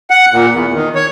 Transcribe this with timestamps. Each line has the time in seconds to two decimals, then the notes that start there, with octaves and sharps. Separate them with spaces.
0.10 F#5
0.33 A#2
0.52 E2
0.74 D#3
0.95 C#5